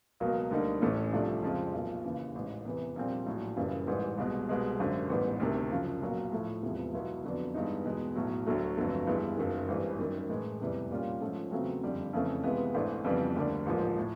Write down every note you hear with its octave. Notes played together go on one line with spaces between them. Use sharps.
C#2 B2 F#3 A#3
D2 D3 G3 A#3 D#4
A1 A2 E3 A3 C#4
C2 C3 F3 A3 D4
F2 C#3 F3 G#3 C4
B1 A#2 F3
D#2 C#3 E3
A1 G#2 E3
E2 C3 E3
A#1 A#2 G3 C4
A#1 A2 F#3
F#1 F#2 C#3 E3 G3
A1 G#2 E3 G3
C2 B2 G#3
C2 B2 G#3 B3
G#1 F#2 D3
A1 G#2 E3 G3 B3
D2 C3 D#3
F#2 C#3 F3
B1 A#2 F#3 A#3
A2 F3 A3
E1 E2 C3 F3 G#3
C#2 B2 F#3 B3 E4
F2 D3 F#3 B3 D4
G2 E3 G#3 B3 D#4
E2 B2 G#3 B3
B1 A2 F#3
D2 D3 F#3 A3
G1 F2 D3 F#3 A3
G2 E3 G#3 B3 E4
F#1 F#2 D#3
G#1 G2 E3 G3
F#2 D#3 G3
A2 E3 G#3
F1 E2 C3 E3 G3
A#2 G3 A#3 C#4 F4
G#2 F3 A3 C#4
E2 C#3 F#3 A3 C4
F#1 F2 D3 G3
F2 C#3 E3 A3 C#4
C#2 C3 E3 G#3 B3
G#1 G#2 E3 A3 D4
F2 C#3 E3 G3 B3
D2 D3 G3 A#3 D4
A1 G#2 F3 A#3
A2